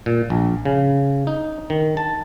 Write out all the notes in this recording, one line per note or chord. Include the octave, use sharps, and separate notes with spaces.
A#2
A#1
C#3
D#4
D#3
A5